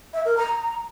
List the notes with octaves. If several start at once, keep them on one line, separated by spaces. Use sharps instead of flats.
E5
A#4
A#5